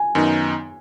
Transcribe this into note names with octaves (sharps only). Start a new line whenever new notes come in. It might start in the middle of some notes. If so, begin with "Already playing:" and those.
Already playing: G#5
F#2 D#3 B3 D#4